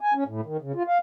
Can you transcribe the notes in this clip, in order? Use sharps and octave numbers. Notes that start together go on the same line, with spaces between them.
G#5
C#4
A2
D#3
C#3
F4
F5